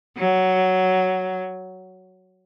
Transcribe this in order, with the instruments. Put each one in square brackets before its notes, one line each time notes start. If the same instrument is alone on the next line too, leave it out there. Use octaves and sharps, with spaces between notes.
[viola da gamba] F#3